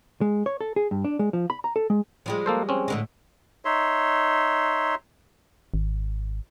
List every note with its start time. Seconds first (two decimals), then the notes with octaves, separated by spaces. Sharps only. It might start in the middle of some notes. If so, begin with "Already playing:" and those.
0.21 G#3
0.46 C#5
0.61 A4
0.76 G#4
0.91 G2
1.05 D4
1.19 G#3
1.33 F3
1.50 B5
1.64 A#5
1.76 A4
1.90 G#3
2.26 F3 G3 G#3
2.46 A#3 A4 C5
2.69 C4 C#4
2.88 A2 D3 G#3
3.65 D#4 C#5 E5 C6
5.74 G#1